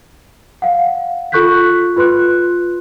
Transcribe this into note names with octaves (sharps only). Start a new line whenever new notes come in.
F5 F#5
F4 A4 C#6 F#6 G6 B6
F4 B4 C6 F#6